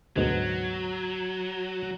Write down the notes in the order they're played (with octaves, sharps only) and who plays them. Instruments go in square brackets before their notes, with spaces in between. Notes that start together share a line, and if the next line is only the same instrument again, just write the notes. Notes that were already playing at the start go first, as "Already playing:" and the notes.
[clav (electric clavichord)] D2 G#2 B2 [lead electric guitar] F#3